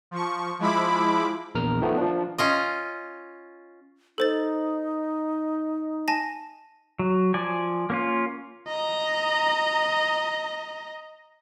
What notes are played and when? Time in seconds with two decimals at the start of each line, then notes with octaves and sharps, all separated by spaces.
0.11 F3 C#6
0.59 F3 G#3 E4 B5 D6
1.55 A#1 E2 A#4 F6
1.81 D#3 F3 A3 B3
1.97 F3 D4
2.38 C#4 F4 D#5
4.18 D#4 A4 C5 A6
6.08 G#5 A5 A#6
6.99 F#3
7.34 F3 D5 G#5
7.90 A#3 C#4 F4
8.68 D#5 A#5